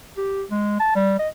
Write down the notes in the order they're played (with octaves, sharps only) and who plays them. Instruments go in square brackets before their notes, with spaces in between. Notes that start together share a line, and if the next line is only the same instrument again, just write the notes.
[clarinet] G4
G#3
A5
G3
D#5